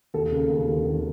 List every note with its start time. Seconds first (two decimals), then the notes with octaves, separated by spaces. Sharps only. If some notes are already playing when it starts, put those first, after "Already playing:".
0.14 D#2 A4
0.32 C#3
0.49 D#2
0.67 D#2
0.85 D#2